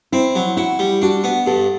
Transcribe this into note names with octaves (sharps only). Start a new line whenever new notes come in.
C4 E4
F#3
E4 F#4
G3
D4 F#4
B3
G2 A4